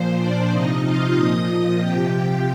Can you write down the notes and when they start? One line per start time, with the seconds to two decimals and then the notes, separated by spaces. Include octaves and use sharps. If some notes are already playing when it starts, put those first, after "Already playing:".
Already playing: A#2 F3 C5
0.17 D4 D5
0.50 C3 F3 D#4 D#5
0.82 F4 F5
1.14 A#2 F3 D#5 D#6
1.46 D#5 D#6
1.78 C3 F3 G4 G5